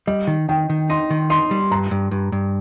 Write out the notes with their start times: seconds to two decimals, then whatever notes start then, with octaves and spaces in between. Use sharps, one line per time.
0.07 G3 D#5
0.27 D#3
0.49 D#3 G5
0.70 D#3
0.90 D#4 C6
1.10 D#3
1.30 D#4 C6
1.51 G3
1.71 G2 A#5
1.91 G2
2.11 G2
2.32 G2